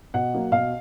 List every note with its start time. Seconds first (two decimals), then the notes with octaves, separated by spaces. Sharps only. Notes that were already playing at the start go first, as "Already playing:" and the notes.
0.14 B2 F#5
0.34 F#3 A#3
0.52 B2 F5